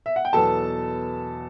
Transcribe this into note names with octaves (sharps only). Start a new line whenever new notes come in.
E5
F#5
G5
E2 B2 F#3 B3 A4 A5